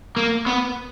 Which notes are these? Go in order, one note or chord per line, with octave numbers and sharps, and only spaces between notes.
A#3
B3